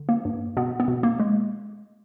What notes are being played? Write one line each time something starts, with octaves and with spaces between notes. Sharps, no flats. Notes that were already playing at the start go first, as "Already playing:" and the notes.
Already playing: D3
A#3
G2
B2 B3
B3
B2
A#3
G#3